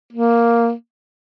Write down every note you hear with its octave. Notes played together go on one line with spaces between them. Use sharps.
A#3